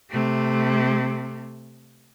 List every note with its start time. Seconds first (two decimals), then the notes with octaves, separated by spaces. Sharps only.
0.10 C3 A3